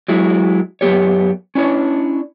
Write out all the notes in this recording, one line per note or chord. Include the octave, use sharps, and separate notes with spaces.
F#3 G#3 E4
F#2 B3 G4 C#5
C#4 D4 E4 C#5